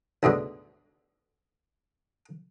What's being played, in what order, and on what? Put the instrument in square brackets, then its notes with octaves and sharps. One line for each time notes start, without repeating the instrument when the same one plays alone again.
[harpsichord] D2 G#2 B2 D3